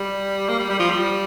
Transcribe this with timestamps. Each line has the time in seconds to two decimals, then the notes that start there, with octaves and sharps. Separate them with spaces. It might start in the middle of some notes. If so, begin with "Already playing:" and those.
Already playing: G3
0.49 A#3
0.59 G3
0.69 G3
0.79 F3
0.90 G3